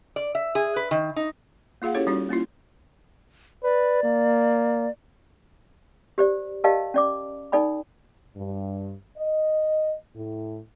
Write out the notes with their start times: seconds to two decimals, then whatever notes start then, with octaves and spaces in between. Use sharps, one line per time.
0.16 D5
0.35 E5
0.55 G#4
0.76 B4
0.91 D#3
1.16 D#4
1.82 A#3 F4 G#4 F5 F#5
1.95 C#4 E4 G4 A4 C#5
2.07 G3 C#4 D#4 F4 F#4
2.29 A#3 C#4 E4 F4
3.63 B4 D5
4.03 A#3
6.18 G4 C5 D5
6.64 G4 A#4 D5 D#5 F5 A5
6.94 C#4 D5 D6
7.52 D#4 A4 D5 G5 B5
8.37 G2
9.18 D#5
10.16 A2